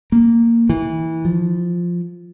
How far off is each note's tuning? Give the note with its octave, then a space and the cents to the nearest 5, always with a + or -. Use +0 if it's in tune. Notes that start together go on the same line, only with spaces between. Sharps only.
A#3 -10
E3 -25
F3 +0